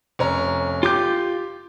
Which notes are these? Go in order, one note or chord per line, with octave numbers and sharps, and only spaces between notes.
F1 C#4 A#5
F4 G4 D6 G6